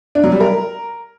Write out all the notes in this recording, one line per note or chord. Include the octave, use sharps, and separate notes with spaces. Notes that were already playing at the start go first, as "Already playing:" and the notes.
D4
F#3
G3
A#4